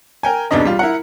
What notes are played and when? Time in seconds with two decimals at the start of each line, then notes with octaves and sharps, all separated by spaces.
0.23 A#4 G5 G#5
0.51 E1 C2 B2 D4 D#4 D#5
0.65 G3 F4
0.79 E4 A#4 F#5